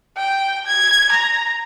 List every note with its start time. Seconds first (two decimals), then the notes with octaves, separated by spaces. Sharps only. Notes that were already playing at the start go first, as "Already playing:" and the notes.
0.17 G5
0.67 G#6
1.12 A#5